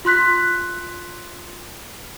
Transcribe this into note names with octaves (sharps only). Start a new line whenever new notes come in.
F4 C6 F#6 B6